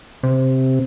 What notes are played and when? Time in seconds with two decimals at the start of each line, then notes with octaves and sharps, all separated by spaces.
0.23 C3